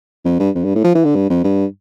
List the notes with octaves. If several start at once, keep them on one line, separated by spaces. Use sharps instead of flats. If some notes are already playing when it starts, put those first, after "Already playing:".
F2
G2
F2
G2
A2
F3
E3
D3
G2
F2
G2